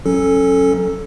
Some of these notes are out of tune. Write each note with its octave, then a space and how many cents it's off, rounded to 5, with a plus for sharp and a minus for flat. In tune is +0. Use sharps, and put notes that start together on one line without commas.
F#3 +0 C#4 -15 A4 +0